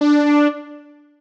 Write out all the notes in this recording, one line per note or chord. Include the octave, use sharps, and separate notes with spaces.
D4